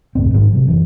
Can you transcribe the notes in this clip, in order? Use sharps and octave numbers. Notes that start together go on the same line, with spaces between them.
F1 D2 G#2 C4
G#2 D#3 F#3
C3 F#3
F#1 E3